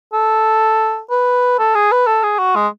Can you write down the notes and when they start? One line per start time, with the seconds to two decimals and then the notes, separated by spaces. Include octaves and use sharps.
0.13 A4
1.10 B4
1.59 A4
1.75 G#4
1.92 B4
2.07 A4
2.24 G#4
2.39 F#4
2.56 G#3